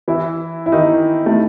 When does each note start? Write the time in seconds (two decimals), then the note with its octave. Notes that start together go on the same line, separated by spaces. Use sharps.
0.08 E3 E4
0.66 E4
0.72 D#3 D#4
1.26 A3